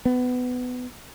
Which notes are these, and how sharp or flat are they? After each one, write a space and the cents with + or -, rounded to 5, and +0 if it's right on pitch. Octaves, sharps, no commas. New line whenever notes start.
B3 +20